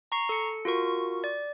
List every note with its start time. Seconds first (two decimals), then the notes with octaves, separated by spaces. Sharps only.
0.12 A#5 C#6 C7
0.29 A4 C#7
0.65 F4 F#4 A#4 C#6
1.24 D5